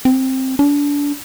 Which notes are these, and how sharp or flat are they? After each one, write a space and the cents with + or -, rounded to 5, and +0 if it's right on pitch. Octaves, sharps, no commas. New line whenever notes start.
C4 +5
D4 -30